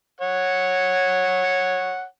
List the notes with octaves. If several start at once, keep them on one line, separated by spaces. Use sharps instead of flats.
C#5 F#5